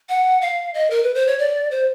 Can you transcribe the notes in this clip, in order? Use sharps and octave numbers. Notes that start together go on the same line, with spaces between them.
F#5
F5
D#5
A#4
B4
C5
C#5
D5
C5